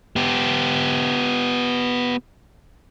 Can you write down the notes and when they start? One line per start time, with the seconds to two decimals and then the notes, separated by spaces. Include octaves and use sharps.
0.16 B3 G4